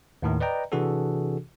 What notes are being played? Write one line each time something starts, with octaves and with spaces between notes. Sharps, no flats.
D#2 A2 D#3
B4 D5 D#5 G5 A#5
C3 E3 D4 F#4 G#4 A4